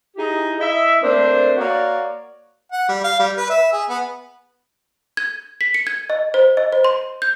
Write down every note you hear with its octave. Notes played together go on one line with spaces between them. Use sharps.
D#4 E4 G4 G#4 D#5
E4 D#5 E5
A3 A#3 C4 D4 C5
A#3 F#4 C#5 D5
F#5
G3
F5
G3
B4
E5
G#4
B3
G#6
B6
C#7
G#6
D#5
C5
D#5
C5
C6
G6